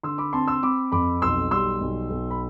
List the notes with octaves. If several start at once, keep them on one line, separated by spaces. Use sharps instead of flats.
D3 C6 E6
B5 D6
C4 A5 C6
C6 E6
C4 B5 D6
F2 B5 D6
B1 C6 E6
G3 C6 E6
B1
B1
B5